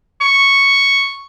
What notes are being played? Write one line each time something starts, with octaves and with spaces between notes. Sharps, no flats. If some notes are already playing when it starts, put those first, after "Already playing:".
C#6